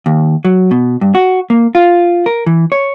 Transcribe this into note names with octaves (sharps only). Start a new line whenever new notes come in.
D#2
F#3
B2
G2
F#4
A#3
F4
A#4
E3
C#5